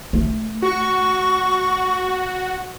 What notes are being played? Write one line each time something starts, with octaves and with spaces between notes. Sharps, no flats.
A3
F#4 C#6